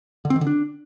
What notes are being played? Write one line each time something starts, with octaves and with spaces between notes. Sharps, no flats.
D3
C4
D#3
D3
D4